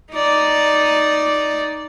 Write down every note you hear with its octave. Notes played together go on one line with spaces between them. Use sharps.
D#4 D5